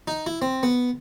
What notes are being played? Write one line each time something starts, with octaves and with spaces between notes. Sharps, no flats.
D#4
E4
C4
B3